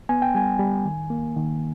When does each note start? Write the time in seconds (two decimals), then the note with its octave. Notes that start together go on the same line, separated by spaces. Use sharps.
0.09 B3 G#5
0.22 G5
0.35 G3 G#5
0.59 G3
0.85 D#3
1.10 A#3
1.36 D#3